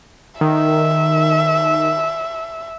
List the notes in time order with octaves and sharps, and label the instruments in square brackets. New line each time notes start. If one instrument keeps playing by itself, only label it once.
[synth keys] D#3 [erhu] E5